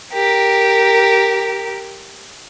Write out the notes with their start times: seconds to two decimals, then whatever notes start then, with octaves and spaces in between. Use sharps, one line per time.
0.14 G4 A#4